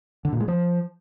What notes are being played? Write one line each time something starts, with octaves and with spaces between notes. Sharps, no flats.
D3
A#2
G#3
F3